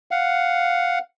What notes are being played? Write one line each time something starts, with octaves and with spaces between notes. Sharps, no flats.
F5 F#5